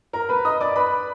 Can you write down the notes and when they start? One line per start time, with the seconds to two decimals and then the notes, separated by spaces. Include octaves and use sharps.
0.13 A#4 A#5
0.29 B4 B5
0.45 D#5 D#6
0.61 D5 D6
0.76 B4 B5